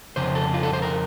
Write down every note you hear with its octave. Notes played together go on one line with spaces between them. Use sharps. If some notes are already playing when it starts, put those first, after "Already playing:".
F2 C#3 C5
A4
F4
A4
C5
A#4